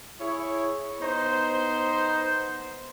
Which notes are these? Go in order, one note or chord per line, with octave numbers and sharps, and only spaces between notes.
E4 G#4 C#5
B3 D#4 C5